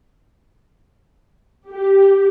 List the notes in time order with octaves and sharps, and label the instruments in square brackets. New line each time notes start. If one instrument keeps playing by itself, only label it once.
[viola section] G4